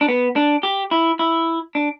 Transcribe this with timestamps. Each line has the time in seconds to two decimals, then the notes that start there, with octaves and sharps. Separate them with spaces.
0.01 D4
0.08 B3
0.36 D4
0.63 G4
0.91 E4
1.19 E4
1.75 D4